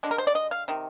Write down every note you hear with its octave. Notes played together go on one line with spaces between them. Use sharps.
D3 G#3 D4
A#4
C5
D5
D#5
F5
C3 D#3